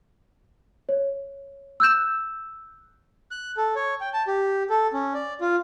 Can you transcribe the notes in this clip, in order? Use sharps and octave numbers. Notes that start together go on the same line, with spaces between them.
C#5
E6 F#6 G6 E7
F#6
A4
C#5
G5
A5
G4
A4
C#4
D5
F4